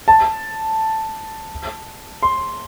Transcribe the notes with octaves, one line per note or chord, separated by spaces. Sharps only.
A5
C6